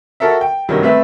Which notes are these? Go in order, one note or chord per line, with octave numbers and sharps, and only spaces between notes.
F#4 A4 A#4 E5
G5
G2 C3 D#3 F#3 G3
A3 C4 B4 E5